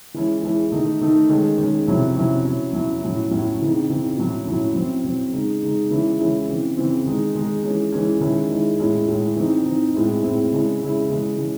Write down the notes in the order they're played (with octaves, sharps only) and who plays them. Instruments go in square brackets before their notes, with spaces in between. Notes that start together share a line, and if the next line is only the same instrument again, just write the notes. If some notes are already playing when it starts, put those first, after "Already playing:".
[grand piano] E3 G#3 C#4 E4
E3 G#3 C#4 E4
D#3 A3 D#4
D#3 A3 D#4
D#3 G#3 C#4
D#3 G#3 C#4
C3 F#3 C#4 E4
C3 F#3 C#4 E4
F#3 C#4 E4
F#3 C#4 E4
A2 F#3 C#4 E4
A2 F#3 C#4 E4
C#3 E3 C4 D#4
C#3 E3 C4 D#4
A2 F#3 C#4 E4
A2 F#3 C#4 E4
F#3 C4 E4
F#3 C4 E4
C#3 G#3 D#4
C#3 G#3 D#4
C#3 E3 G#3 C#4 E4
C#3 E3 G#3 C#4 E4
C#3 E3 C4
C#3 E3 C4
D#3 G#3 D#4
D#3 G#3 D#4
E3 G#3 C#4
E3 G#3 C#4
D#3 G#3 C#4 E4
D#3 G#3 C#4 E4
A2 G#3 C#4 E4
A2 G#3 C#4 E4
E3 C4 D#4
E3 C4 D#4
A2 G#3 C4 E4
A2 G#3 C4 E4
C#3 G#3 C#4 E4
C#3 G#3 C#4 E4
C#3 E3 G#3 C#4
C#3 E3 G#3 C#4